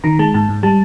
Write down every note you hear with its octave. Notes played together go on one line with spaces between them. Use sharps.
D#3 A#5
G#3 A5
G#2 A5
G#2
G3 A5